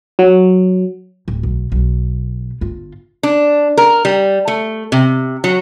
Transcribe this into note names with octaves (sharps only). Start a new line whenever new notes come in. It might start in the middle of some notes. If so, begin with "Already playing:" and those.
F#3
D1
B1
B1
G1 F4
D4
A#4
G3
A3
C3
F#3